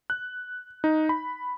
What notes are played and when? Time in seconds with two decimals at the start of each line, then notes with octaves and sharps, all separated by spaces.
0.10 F#6
0.84 D#4
1.09 B5